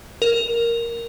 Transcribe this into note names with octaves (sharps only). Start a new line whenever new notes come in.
A#4